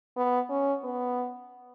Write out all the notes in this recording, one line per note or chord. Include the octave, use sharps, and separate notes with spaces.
B3
C#4
B3